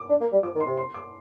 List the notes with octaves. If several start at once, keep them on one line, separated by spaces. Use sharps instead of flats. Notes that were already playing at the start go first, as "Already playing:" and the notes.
Already playing: D6
D4
A#3
G3
F3 D6
D#3
C6
C3
C6
D6